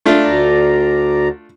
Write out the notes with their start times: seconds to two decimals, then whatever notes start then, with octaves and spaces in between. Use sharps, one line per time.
0.06 A3 D4 F4
0.23 D2 D5 A#5